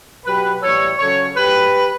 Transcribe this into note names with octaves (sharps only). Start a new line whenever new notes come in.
B2 F#3 G4 B4
A2 E3 G3 A4 C#5
C#3 F#3 A4 C#5
A2 F#3 G4 B4